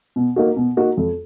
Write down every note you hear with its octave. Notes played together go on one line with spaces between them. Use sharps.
B2
A#3 D#4 F#4
B2
A#3 D#4 F#4
F2